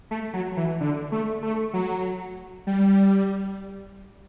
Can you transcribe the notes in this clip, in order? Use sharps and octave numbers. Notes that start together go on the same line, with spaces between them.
A3
F#3
E3
D3
A3
A3
F#3
G3